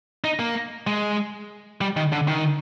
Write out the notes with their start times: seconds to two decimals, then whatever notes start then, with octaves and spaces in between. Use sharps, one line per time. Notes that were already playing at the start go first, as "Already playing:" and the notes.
0.24 D#4
0.39 A#3
0.87 G#3
1.81 G3
1.97 D#3
2.12 D3
2.28 D#3